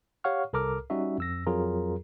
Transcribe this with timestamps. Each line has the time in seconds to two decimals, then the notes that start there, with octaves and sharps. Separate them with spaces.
0.24 G4 C#5 F5 F#5 C#6 F6
0.53 C2 A4 A#4 A#5 D6 F6
0.90 G3 C#4 D#4 F#4 E5
1.18 F2 E6 A#6
1.47 F2 F#3 F4 G#4 A#4 A#5